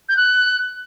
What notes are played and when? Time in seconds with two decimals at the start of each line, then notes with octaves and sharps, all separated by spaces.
0.09 G6
0.17 F#6